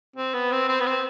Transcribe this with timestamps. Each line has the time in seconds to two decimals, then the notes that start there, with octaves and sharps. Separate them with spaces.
0.16 C4
0.34 B3
0.52 C4
0.68 C4
0.80 B3
0.86 C4